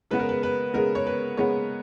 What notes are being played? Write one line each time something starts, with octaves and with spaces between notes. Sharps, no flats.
C#3 G#3 B3 B4
A#4
B4
B4
C#3 G#3 B3 A#4
C#5
B4
C#3 G#3 B3 C#5